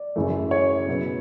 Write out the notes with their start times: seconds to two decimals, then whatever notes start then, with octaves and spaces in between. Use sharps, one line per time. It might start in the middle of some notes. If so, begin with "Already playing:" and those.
Already playing: D5
0.16 F#2 C#3 E3 A3
0.51 C#5
0.87 B2 F#3 B3